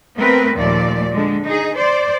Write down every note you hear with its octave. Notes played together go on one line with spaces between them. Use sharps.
A3 B3 C4 A#4 B4
D#2 A#2 F3 A3 D5
D3 G#3
D#4 G#4
C5 D5